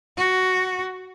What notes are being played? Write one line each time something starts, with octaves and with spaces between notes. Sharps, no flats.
F#4